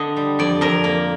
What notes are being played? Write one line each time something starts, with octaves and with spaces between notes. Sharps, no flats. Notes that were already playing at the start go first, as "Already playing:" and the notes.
Already playing: D3 D#5
G3
F2 D5
F2 A#4
A#3